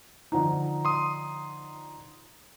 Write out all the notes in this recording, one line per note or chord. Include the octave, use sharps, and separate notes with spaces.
D3 F3 D#4
C6 D#6